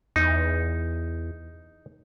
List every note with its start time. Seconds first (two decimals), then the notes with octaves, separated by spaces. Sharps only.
0.16 E2 D#4